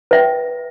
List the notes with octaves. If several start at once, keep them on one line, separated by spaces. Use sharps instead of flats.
B4 E5 G5